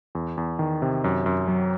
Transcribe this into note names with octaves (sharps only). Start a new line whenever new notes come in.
E2
E2
D#3
C3
F#2
F#2
F#3